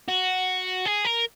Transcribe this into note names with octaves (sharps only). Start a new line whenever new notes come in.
F#4
G#4
A#4